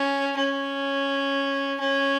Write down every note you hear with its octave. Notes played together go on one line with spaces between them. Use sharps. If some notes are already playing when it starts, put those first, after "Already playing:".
Already playing: C#4
C#4
C#4